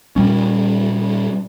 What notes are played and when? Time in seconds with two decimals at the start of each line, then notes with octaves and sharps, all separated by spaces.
0.16 A#2 G3 C#4